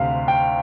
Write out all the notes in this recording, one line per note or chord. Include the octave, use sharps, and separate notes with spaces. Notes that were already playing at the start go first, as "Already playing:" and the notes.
Already playing: D2 C3 F5
G5